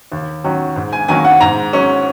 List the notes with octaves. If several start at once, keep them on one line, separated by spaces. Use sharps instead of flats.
D#2
D#3 F#3 C#4
G#2
G#5
D#3 F#3 A#3 C#4 G#5
F#5
G#2 A#5
F#3 C#4